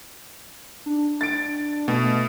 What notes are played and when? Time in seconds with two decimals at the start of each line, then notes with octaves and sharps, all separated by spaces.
0.86 D4
1.21 A6 D7
1.88 B2 A3